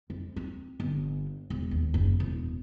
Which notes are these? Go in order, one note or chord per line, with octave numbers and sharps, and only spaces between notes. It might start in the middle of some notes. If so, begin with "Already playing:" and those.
F2
C4
G1
E1
D#2
F#1
E1